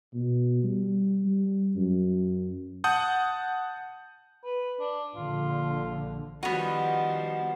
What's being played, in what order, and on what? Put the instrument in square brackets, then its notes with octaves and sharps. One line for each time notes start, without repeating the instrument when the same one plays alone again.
[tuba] B2
G3
G3
F#2
[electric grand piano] F#5 A5 D#6 G6
[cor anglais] B4
D4
[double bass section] A#1 D3 [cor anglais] F4
[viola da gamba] D#3 F3 G3 [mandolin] B3 D#5 [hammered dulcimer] F#4 F#5